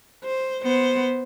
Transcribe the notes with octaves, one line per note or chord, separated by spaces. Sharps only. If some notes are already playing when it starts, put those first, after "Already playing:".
C5
B3 C5